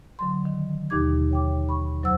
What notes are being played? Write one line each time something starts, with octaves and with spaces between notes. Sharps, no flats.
D3 F#3 C6
D#3
D#2 B2 D#4 G4 D6 G#6
C#5 G5 D6
B5 C#6
F2 F#3 C5 F#5 E6